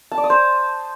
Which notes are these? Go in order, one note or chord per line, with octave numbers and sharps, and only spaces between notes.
A5
D5
D#6
C5